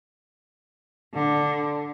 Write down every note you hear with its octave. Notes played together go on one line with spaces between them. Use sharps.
D3